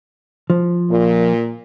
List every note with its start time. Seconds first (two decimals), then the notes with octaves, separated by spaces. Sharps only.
0.50 F3
0.90 A#2